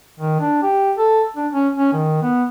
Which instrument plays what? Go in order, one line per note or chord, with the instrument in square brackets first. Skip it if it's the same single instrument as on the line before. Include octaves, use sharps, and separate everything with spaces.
[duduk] D#3
D4
G4
A4
D4
C#4
C#4
D#3
B3